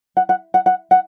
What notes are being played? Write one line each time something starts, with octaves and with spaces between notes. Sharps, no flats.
F#5
F#5
F#5
F#5
F#5